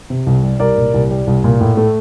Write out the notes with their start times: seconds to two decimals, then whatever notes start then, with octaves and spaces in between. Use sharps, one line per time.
0.10 C3
0.27 C2
0.43 G3
0.60 C2 A#4 D5
0.77 A#2
0.94 C2
1.11 G3
1.27 C2
1.44 A#2
1.60 A2
1.77 A3